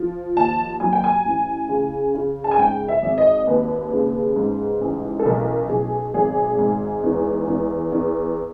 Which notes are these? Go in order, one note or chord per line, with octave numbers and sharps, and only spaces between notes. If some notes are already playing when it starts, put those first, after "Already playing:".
Already playing: F3
D#2 A5
F#3 G#5
G5
G#5
A1
C#3
C#3
A5
G#5
G#2 G5
E5
G#1
D#5
D#2 B4
C#3
G#2
A1
A4
B1 A#4
B1 G#4
G#1 G#4
G#2
E2
E2
E2